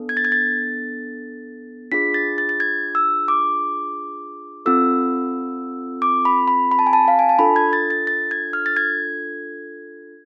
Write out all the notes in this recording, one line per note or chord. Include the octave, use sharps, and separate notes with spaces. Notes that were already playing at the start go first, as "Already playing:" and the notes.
Already playing: B3 D4 A4
G#6
A6
G#6
A6
D4 F4 G#4 B6
A6
A6
A6
G#6
E6
D6
C4 F4 A4 E6
D6
B5
B5
B5
A5
G#5
A5
F5
G#5
A5
D4 F4 A4 B5
G#6
A6
A6
A6
G#6
F6
A6
G#6